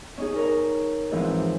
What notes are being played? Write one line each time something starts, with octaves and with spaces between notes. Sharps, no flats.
C#4 D#4 G#4
A#4 C#5 A#5
G#2 E3 F3 C4